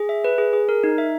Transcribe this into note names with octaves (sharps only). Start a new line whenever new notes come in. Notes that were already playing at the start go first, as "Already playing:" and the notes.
Already playing: G#4
E5
B4
G#4
G#4
A#4
D#4
E5